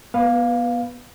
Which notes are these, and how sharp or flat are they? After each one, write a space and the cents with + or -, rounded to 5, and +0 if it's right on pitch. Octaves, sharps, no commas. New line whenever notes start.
B3 -20 B4 +0 F5 +10